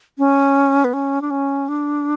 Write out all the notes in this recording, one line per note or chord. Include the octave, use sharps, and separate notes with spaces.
C#4
B3
C#4
D4
C#4
D4